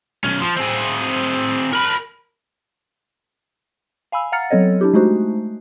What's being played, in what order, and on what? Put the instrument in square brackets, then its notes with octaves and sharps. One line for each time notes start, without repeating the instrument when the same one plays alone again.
[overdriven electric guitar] B1 C#4
F3
C4 G#4
A#4 B5
[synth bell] F5 G#5 B5 E6
F5 F#5 A#5 F6 A6 C#7
F#3 B3 C4 A4 C#5 D#5
D4 E4 G4
G#3 A3 D#4 F#4 C5